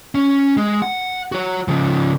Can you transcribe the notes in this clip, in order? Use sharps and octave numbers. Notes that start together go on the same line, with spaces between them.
C#4
G#3
F#5
F#4 C#5
C#3 F3